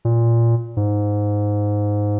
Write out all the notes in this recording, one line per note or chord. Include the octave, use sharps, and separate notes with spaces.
A#2
G#2